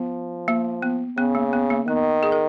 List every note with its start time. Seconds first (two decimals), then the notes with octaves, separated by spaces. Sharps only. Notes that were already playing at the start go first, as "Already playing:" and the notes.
Already playing: F3 B3
0.48 A#3
0.82 B3
1.17 C#3 B3
1.35 A#3
1.53 B3
1.70 A#3
1.87 D#3 B3
2.23 G#4
2.32 A#4